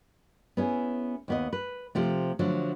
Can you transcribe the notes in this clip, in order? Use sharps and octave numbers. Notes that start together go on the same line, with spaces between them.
B3 C#4 E4 G#4
D#2 B3 D#5
B4
C3 F3 A3
D3 F3 F#3 A3